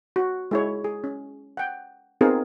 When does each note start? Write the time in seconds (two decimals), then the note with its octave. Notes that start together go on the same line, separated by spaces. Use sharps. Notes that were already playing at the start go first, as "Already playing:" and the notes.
0.16 F#4
0.51 G#3 E4 C#5
0.84 G#4
1.04 C#4
1.57 F#5 G5
2.21 B3 C4 D#4 F4 G#4 A#4